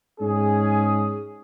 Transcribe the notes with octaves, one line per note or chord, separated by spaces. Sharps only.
G#2 C#4 G#4